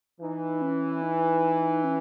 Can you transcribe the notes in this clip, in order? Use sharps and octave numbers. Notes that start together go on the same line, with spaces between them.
E3 D#4
C#4
D#4
C#4